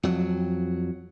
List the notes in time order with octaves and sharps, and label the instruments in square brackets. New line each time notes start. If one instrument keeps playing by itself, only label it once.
[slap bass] F2 F#3